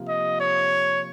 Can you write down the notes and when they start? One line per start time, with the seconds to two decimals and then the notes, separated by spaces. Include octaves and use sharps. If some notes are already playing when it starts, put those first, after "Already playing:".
Already playing: C3 F3 A#3
0.09 D#5
0.41 C#5